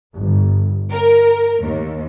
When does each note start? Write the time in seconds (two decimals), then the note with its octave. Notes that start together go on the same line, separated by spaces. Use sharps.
0.15 G1
0.90 A#4
1.61 D#2